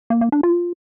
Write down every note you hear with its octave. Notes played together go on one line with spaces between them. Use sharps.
A#3
A#3
D4
F4